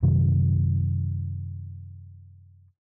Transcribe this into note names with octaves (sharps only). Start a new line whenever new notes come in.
F#2 C3 D#3 F#3